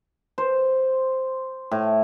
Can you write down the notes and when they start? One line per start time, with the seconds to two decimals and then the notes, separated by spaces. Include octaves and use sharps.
0.38 C5
1.71 A2